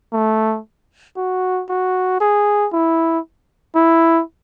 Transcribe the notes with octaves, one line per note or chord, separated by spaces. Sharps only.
A3
F#4
F#4
G#4
E4
E4